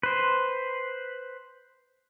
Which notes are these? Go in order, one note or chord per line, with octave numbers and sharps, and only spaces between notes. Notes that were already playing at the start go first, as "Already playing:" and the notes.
B4 C5